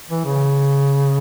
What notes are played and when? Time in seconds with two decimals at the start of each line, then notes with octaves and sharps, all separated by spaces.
0.10 E3
0.25 C#3